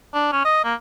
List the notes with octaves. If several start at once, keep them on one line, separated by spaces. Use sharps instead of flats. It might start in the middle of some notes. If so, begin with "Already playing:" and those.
D4
C#4
D#5
A#3